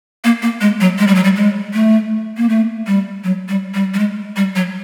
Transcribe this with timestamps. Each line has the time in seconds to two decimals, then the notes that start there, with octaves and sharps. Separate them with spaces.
0.24 A#3
0.42 A#3
0.61 G#3
0.81 F#3
0.99 G#3
1.07 G3
1.15 F#3
1.24 G3
1.36 G#3
1.74 A3
2.37 A#3
2.49 A3
2.87 G3
3.24 F#3
3.49 G3
3.74 G3
3.94 G3
3.99 G#3
4.36 G3
4.56 F#3